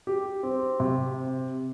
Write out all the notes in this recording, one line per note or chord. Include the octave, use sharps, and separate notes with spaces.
G4
C4
C3